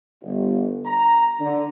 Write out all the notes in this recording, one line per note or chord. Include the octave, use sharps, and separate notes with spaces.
G1
A#5
D3